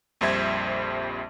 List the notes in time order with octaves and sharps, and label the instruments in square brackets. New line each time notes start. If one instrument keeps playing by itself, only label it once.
[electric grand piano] A#1 F2 G3 C5 E5 G#6